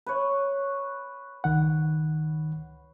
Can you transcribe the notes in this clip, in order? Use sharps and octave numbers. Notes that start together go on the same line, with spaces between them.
B4 C#5
C#2 D#3 F#5